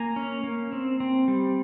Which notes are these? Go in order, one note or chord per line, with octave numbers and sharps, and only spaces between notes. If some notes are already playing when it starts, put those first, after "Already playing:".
Already playing: A#3 G#5 A#5
C#4
A#3
C4
C4
G3